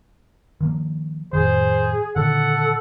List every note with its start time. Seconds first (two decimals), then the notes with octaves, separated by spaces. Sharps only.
0.61 D#3 F3 A#3
1.33 F2 A2 D#3 G#4 C5
2.16 A#2 D3 D#3 A4 F#5